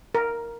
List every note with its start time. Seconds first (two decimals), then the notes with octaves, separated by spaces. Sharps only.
0.15 A#4